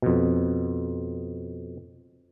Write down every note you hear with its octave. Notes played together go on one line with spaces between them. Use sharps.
F2 B2